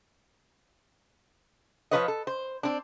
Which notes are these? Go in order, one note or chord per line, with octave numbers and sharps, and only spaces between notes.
F3 G#3 F4 B4 C#5 D#5
A4
C5
C4 D4